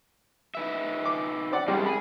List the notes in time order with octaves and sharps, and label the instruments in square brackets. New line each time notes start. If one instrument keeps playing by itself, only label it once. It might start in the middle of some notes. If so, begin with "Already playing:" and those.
[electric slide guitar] D#4 B4 E5
[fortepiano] D6
C4 D5 F#5
[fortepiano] C2 G3 [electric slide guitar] C3 G#3
[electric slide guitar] G#4 [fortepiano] B5